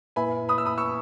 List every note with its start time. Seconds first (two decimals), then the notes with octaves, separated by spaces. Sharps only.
0.16 A#2 A#3 E4 B4 E5 G#5 B5
0.49 B5 D#6
0.58 E6
0.65 B5 D#6
0.78 C#6 E6